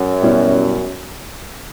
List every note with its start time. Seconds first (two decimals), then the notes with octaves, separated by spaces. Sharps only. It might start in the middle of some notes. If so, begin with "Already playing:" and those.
Already playing: F#2
0.22 B2 G3 C#4 E4